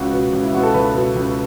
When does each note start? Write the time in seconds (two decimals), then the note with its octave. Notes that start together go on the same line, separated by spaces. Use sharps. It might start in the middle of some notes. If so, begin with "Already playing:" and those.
Already playing: C#2 F#4
0.13 B2 B3
0.33 C#2
0.43 E4
0.54 B2 B3 F#4
0.63 A4
0.74 C#2 B4
0.95 B2 B3
1.15 C#2